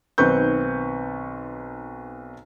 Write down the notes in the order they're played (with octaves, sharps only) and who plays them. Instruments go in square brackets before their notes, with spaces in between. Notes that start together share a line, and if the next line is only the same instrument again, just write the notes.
[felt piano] B1 D#3 C4 B4 C#6 G6